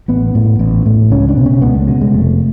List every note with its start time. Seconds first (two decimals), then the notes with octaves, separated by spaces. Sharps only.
0.08 A1 B3
0.35 A2
0.59 A1
0.86 A2
1.11 C#2 C#4
1.29 D4
1.37 B2
1.46 C#4
1.62 C#2 B3
1.75 A3
1.87 B2 G#3
2.01 G#3
2.13 F1 A3